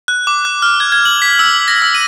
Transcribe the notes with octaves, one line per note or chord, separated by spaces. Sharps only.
F#6
D6
F#6
F6
G#6
G#6
F#7
B6
E6
A#6
E6
D#7